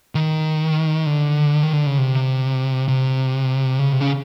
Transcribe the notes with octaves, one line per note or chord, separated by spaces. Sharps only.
D#3
D3
D#3
D3
C#3
C3
C3
C#3
C3
C#3